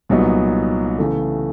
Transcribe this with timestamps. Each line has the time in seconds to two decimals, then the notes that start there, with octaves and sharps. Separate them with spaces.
0.09 C2 A#2 F#3 B3 D#4
0.98 C#3 E3 A3